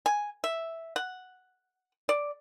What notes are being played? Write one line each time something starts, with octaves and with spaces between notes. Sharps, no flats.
G#5
E5
F#5
D5